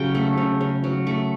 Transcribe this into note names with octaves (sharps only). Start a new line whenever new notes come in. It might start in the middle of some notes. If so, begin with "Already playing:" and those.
Already playing: C#3 F#3 G5
A3
C#3
C#3
F#3
A3